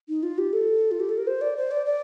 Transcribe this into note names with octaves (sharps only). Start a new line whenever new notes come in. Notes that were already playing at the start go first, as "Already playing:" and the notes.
D#4
F4
G4
A4
F4
G4
A4
A#4
C5
D5
C5
D5
D5